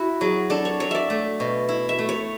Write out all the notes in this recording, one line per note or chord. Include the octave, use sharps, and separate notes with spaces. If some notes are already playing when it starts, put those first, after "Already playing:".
Already playing: E4 F#4
F#3 G#4
D4 A4
C#5
F#3 C#5
D5 E5
A3
B2
E4
E5
A3
C#5